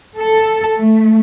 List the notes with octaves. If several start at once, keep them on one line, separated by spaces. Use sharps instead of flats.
A4
A3